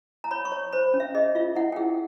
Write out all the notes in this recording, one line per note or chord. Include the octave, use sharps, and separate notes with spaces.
A#5
C#5 B5
C#6
C#5
C5 B5
C#4
E5
G#4 D#5
F4 E5
E4 F#5
G5
G#4 F#5